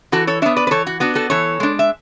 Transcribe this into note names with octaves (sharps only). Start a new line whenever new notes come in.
E3 F#4 A4
A4 C#5
B3 D4 C#5 E5
B4 D5
B4
E3 A4 C#5
F#4
B3 D4 F#4
F#4 A4
E3 A4 C#5
G#3 D4
E5